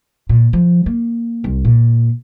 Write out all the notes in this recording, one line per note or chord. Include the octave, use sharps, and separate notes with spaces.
A#2
F3
A#3
C2
A#2